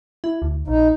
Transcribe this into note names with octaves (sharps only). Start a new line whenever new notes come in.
E4
D2
A#1 D#4